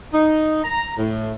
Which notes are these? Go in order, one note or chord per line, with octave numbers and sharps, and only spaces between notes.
D#4
A#5
A2